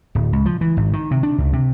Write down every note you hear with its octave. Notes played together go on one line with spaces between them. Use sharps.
D1
C#2
F3
E3
G#1
D#3
C3
D4
C#2
C3